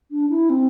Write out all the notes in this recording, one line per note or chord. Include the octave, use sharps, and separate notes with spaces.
D4
E4
C4